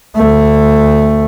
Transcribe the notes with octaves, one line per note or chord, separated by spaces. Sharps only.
D2 A3